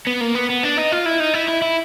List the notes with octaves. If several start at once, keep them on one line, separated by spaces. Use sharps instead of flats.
B3
A#3
B3
B3
D4
D#4
F4
E4
D#4
E4
E4
E4